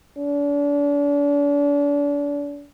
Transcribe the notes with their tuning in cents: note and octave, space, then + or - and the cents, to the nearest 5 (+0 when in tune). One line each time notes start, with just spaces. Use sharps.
D4 -35